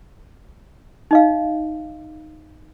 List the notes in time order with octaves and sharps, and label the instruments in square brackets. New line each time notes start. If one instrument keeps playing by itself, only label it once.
[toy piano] D#4 D#5 F5